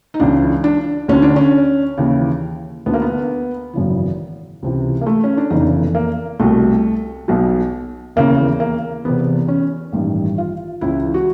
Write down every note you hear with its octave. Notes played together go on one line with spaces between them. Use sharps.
D#4
C#2 C#3 E3 D4
D4
D2 D3 C#4
D4
C#4
D#2 C#3 E3
D2 D3 B3
A#3
B3
G#1 F#2 C#3 E3
C#2 C3 E3
A#3
A3
C#4
D4
F1 E2 C#3 E3 D#4
A#3
C2 B2 A3
B1 B2
E1 D#2 C#3 E3 A#3
A#3
E1 E2 C3 B3
C#4
A1 G2 D#3
F4
C#2 C#3 E3 E4
F#4